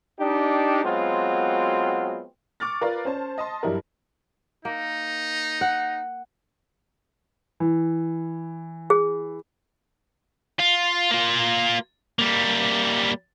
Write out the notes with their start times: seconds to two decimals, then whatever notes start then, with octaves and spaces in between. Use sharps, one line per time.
0.20 D4 D#4 G4
0.84 F#3 G#3 B3 C4 F4 F#4
2.60 C#6 D6 F6 A6
2.81 F4 A#4 B4 D5
3.05 C#4 C5 A5
3.38 D#5 A5 C6
3.63 G2 F#3 G3 E4 A#4
4.65 A#3 D#4
5.61 F#5
7.60 E3
8.90 G#4
10.59 F4
11.11 A#3 F4
12.19 G3 A#3